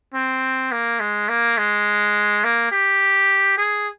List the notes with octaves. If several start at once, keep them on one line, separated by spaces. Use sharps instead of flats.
C4
A#3
G#3
A#3
G#3
A#3
G4
G#4